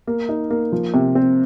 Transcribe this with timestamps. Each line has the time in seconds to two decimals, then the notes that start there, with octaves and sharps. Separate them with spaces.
0.07 A#3
0.29 D#4
0.51 A#3
0.72 F3
0.94 C3
1.15 C4